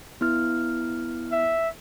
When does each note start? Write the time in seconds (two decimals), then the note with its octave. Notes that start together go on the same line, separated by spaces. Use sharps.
0.21 B3 E4 F6
1.32 E5